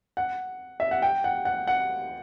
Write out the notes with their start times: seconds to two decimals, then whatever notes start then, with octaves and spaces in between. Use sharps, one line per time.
0.17 F#5
0.80 E5
0.91 F#5
1.02 G5
1.24 F#5
1.45 F#5
1.67 F#5